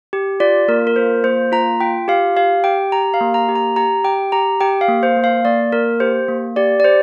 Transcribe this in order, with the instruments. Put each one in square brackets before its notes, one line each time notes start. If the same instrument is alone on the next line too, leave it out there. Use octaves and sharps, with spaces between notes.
[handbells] G4
F4 D5
A#3 A#4
A#4
F4 C5
A#3 C5
F4 A#5
F4 G5
G4 F5
G4 F5
G4 G5
G4 A#5
F5
A#3
A#5
G4
A#5
G4 A#5
G4 G5
G4 A#5
G4 G5
F5
A#3
C5
A#3
F5
A#3 D5
A#3 A#4
G4 C5
A#3
G4 D5
D5
G4 C5